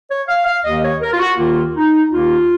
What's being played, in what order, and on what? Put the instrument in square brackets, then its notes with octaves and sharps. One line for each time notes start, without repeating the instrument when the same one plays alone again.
[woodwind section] C#5
F5
F5
D#2 D#3 A#3 D#5
C#5
A#4
F4
F#4
D#2 D#3 A#3 F4
D#4
D#2 D#3 A#3 F4